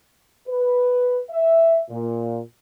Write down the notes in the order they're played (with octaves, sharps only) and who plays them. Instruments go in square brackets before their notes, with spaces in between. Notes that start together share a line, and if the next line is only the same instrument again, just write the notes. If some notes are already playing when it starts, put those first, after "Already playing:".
[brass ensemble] B4
E5
A#2